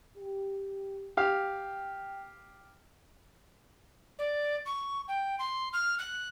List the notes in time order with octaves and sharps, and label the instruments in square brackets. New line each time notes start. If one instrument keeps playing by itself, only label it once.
[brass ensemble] G4
[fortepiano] G4 F5 [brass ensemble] G5
[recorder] D5
C#6
G5
C6
F6
F#6